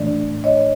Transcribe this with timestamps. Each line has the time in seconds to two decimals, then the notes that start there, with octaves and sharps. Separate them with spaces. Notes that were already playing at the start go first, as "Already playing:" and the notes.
Already playing: A2 E3 A3 D4 D5
0.44 C#5 D#5